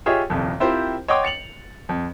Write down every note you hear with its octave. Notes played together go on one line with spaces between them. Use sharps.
F4 G4 G#4 C#5 D#5 E5
D#1 C2 F2
C4 E4 F4 G4 A#4 C5
C#5 D#5 F#5 G5 C6 D6
A6 C#7 F7 F#7
F2